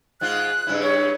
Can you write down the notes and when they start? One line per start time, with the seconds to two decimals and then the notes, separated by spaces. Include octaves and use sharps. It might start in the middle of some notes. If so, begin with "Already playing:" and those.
0.21 G#2 G#3 F4 F#6
0.67 G2 C#3 E4
0.82 C#5